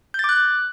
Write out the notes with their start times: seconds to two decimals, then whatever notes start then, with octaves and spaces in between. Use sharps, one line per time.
0.14 G6
0.19 A6
0.24 D6
0.29 F#6